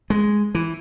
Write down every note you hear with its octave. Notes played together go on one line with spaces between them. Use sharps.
G#3
E3